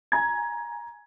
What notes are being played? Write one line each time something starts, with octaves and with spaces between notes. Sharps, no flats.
G#5 A#5 G#6